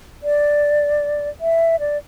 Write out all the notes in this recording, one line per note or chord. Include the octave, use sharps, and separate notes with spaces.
D5
E5
D5